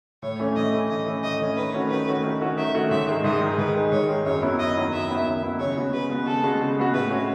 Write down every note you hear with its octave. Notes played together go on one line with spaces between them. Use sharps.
A2 C#5
E3 A3 C#4
A2 D#5
E3 A3 C#4
A2 D#5
E3 A3 C#4
A2 D#5
E3 A3 C#4
D#3 B4
A3 C#4 F#4
D#3 B4
A3 C#4 F#4
D#3
A3 C#4 F#4
D#3 E5
A3 C#4 F#4
G#2 E5
D#3 G#3
G#2 D#5
D#3 G#3
G#2 B4
D#3 G#3
G#2 C#5
D#3 G#3
F#2 C#5
D#3 F#3 B3 E4
F#2 D#5
D#3 F#3 B3 E4
F#2 E5
D#3 F#3 B3 E4
F#2
D#3 F#3 B3 E4
C#3 C#5
G#3 B3 F#4
C#3 B4
G#3 B3 F#4
C#3 A4
G#3 B3 F#4
C#3
G#3 B3 F#4
A2 B4
G#3 C#4 F#4